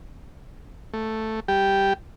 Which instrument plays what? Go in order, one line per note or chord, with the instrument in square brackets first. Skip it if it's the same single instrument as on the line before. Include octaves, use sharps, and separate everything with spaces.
[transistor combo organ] A3
G3 G4 G5